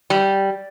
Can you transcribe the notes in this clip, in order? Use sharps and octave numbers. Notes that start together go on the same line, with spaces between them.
G3